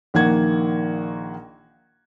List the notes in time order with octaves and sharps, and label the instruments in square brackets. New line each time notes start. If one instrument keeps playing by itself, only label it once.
[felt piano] A#1 D#3 A#3 F#5 G#6